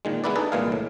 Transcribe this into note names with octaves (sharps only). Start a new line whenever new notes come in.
A#2 D#3 G#3
G#3 B3 E4 B4 D5
D4 D#4 G#4 A4 B4
C2 A#2 E3 G#3 G#4 F5
A2